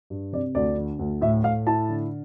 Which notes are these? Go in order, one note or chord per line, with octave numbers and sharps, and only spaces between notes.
G2
C3 D5
D2 D5
D3
D2
A2 E5
A2 F5
E4 A5
D3